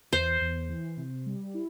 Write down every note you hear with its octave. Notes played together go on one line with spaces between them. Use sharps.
E2 C5
E2
E3
C3
G3
E4